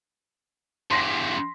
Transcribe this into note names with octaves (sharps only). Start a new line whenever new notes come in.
E2 G2 C6 A#6 B6